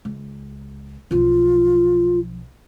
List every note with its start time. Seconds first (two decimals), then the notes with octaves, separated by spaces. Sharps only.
0.05 C#2
1.11 B1 F3 F4